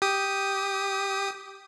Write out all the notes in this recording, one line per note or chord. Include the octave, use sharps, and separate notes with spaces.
G4 D#6